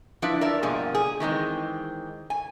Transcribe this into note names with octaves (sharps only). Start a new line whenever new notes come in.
F3 D4 E4 B4
A#4 D5 E5
G2 B2 F3 A#3 G#4
G#4
D#3 E3 G#3 C4
G#5